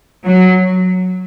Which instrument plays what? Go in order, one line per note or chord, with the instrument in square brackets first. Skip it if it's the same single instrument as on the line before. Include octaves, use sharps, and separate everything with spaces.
[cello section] F#3